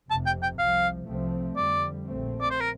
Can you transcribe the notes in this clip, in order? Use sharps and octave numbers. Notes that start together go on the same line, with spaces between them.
F1 F2 C3 A5
G5
G5
C2 C3 F3 F5
C2 C3 F3 A3 C4
F2 D3 G3 D5
A#1 A#2 A3 C4
D5
C5
A#4